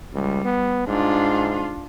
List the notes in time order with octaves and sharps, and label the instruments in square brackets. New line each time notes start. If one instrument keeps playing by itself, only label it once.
[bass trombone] C#2 [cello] G3
[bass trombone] B3
[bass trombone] G#2 [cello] D4 F4